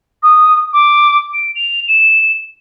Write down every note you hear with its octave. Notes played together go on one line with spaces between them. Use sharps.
D#6
D6
D7
F7
E7